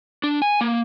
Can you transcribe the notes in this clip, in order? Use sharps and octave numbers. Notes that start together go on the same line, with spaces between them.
D4
G#5
A#3